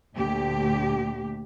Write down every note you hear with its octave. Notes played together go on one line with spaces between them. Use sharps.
D2 A#2 G4